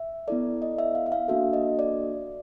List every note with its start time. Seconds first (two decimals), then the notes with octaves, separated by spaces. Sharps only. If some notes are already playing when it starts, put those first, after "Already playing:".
Already playing: E5
0.27 B3 E4 A4 D5
0.62 D#5
0.79 E5
0.95 F5
1.06 E5
1.12 F5
1.28 A#3 D4 F#4 A4 E5
1.53 D#5
1.79 D5